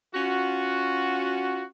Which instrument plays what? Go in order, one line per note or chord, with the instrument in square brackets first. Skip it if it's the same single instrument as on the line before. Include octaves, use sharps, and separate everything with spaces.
[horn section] C#4 F4 F#4